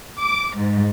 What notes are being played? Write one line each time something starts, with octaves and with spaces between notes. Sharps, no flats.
D6
G#2